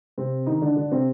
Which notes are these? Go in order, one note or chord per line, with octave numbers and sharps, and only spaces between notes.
C3 C4
D#3 D#4
D3 D4
D3 D4
C3 C4